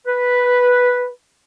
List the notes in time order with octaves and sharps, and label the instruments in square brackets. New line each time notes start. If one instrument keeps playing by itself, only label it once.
[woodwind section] B4